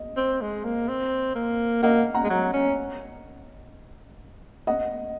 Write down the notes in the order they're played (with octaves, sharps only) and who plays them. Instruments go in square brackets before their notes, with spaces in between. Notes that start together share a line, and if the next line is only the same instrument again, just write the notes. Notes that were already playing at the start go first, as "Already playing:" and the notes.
Already playing: [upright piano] D#5
[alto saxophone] C4
G#3
A#3
C4
A#3
[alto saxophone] A#3 [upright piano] D#5 F#5
[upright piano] F#5 A#5
[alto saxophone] G#3
F#3
C#4
[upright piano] D#5 F#5